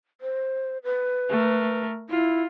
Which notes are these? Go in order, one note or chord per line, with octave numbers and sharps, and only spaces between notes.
C5
B4
A3 A#4
E4 F4